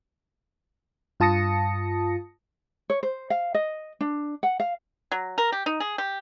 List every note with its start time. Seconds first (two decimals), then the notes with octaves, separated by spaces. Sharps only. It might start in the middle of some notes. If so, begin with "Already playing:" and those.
1.20 G2 F4 A5 D#6 A#6 C#7
2.90 C#5
3.03 C5
3.30 F5
3.55 D#5
4.01 D4
4.43 F#5
4.60 F5
5.12 F#3
5.38 A#4
5.52 G4
5.66 D#4
5.80 G#4
5.98 G4